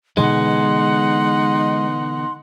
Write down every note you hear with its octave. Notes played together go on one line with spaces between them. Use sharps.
B2 D3 E3 G#3 D#4 F#5 C6